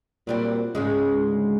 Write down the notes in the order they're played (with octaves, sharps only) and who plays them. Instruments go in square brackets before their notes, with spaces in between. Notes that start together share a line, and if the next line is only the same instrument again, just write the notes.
[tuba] A#2 [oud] F#3 G3 C4
[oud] G#2 C#3 G#3 [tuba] C#4
[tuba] D2